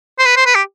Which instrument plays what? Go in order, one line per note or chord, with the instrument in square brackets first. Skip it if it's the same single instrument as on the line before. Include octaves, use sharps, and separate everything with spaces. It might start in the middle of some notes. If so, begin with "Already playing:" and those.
[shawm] C5
B4
C5
B4
G4